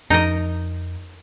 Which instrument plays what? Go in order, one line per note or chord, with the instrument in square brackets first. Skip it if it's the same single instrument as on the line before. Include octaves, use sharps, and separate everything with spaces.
[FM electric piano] F2 [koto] D#4 A#4 D#5